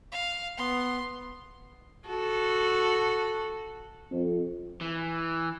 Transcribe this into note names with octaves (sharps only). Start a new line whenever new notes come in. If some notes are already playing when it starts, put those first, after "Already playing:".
F5
B3 C6
F#4 A4
F2
E3